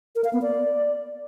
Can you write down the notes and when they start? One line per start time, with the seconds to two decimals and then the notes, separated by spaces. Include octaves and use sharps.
0.16 A#4
0.24 F5
0.33 B3
0.42 D5